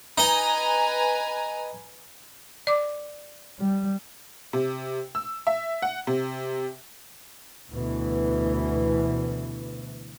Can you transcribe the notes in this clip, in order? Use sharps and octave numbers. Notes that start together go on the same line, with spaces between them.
D#4 B4 D#5 G#5 A#5
D5 D6
G3
C3
E6
E5
F#5
C3
D2 B2 E3